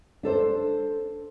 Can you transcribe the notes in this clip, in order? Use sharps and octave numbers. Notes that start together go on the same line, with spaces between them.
D4 A4 C5